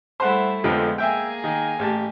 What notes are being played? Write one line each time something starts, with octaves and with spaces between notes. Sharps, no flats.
G3 A3 E4 C5 F#5
F2 D3 F3 G#3 B3
A#3 G#4 E5 G5 G#5
D#3
A1 G4 A5